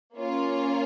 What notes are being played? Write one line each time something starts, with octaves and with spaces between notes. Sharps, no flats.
A#3 C#4 F4